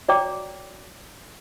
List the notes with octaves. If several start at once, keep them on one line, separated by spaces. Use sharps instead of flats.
F#4 C#5 D5 G5 A#5 D6